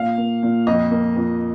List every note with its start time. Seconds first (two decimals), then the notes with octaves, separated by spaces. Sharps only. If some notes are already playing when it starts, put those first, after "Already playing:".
Already playing: A#2 F5
0.18 A#3
0.43 A#2
0.67 F2 D#5
0.91 A#3
1.16 F2